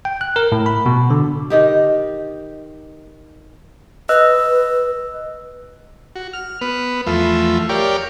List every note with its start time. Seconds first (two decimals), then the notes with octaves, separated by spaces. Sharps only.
0.05 G5
0.21 F#6
0.36 A#4
0.52 A2
0.66 B5
0.86 B2
1.10 D3
1.50 D#3 D#4 G4
4.09 B4 D#5 E6 F#6
6.16 F#4
6.33 F6
6.61 B3 B4
7.07 E2 F3 A3 F4 E5
7.69 G4 A#4 C#5 D5 F5 G5